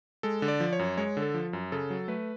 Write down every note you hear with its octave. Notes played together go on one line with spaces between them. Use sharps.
G#3 A4
D3
D5
F3
C#5
F#2
G#3 C#5
D3
A4
F3
F#2
C#3 A4
F#3
A3 B4